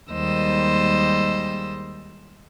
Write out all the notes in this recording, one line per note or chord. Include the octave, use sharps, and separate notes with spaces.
D#2 G3 G#3 C5 D#5 E6